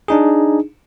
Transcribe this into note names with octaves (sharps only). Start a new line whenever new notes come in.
D4 D#4 G#4